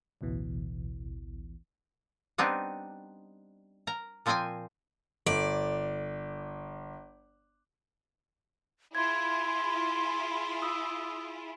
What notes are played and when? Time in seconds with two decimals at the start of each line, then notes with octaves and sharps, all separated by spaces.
0.21 A1 D2 B2 E3
2.38 G3 B3 C4 D4 D#4
3.87 A#4 A#5
4.26 A#2 F3 C4 C5 G5 G#5
5.26 G1 D5
8.95 E4 F4 G#4 C6 G#6
10.62 D#6 E6